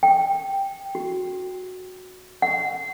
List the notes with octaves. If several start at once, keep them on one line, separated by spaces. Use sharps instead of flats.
G5
F#4
F#5